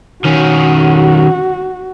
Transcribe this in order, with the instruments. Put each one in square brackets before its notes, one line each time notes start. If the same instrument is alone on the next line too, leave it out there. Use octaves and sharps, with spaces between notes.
[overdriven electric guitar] D#3 C#4 [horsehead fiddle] F#4